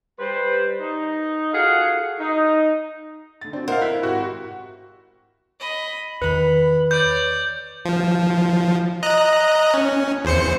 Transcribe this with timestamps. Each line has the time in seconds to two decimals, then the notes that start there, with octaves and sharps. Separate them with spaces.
0.20 G3 B4 C5
0.80 D#4
1.53 F4 F#4 G#4 A4 F5 F#5
2.20 D#4
3.41 D3 A6
3.53 C4 D4 F#4
3.68 E4 A#4 C5 D#5 F5 F#5
3.81 E4 E6 F#6 B6
4.03 G#1 F#4 G4 F#6
5.60 D#5 B5
6.22 E2 D#3 B4 B5
6.91 C#5 D5 G6
7.85 F3
9.03 D#5 A#5 F#6
9.74 C#4
10.25 E2 C5 C#7